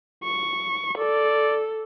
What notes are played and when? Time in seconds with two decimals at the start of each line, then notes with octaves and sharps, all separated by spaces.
0.24 C#6
0.97 A4 D5